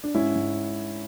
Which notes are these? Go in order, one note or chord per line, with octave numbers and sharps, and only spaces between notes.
D4
G#2 C#4 E4
G#2